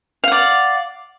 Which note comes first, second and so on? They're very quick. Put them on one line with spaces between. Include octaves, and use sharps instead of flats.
F5 F#5 D5